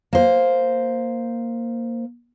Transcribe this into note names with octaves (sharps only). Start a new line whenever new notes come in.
A#3 C5